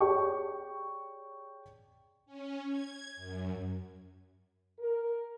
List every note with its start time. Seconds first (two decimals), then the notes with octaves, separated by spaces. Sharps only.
0.01 G4 G#4 C#5 D5 G5 C#6
2.26 C#4
2.68 G#6
3.16 F#2
4.79 A#4